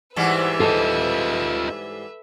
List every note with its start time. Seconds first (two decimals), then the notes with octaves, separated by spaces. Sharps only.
0.16 G#2 E3 G3 B4 E5
0.60 F4 A4 D#5